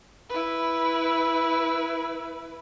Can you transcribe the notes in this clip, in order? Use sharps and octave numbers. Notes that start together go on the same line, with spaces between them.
E4 B4